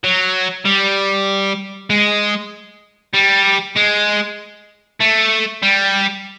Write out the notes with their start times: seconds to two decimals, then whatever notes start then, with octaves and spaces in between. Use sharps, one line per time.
0.04 F#3
0.65 G3
1.90 G#3
3.14 G3
3.77 G#3
5.01 A3
5.63 G3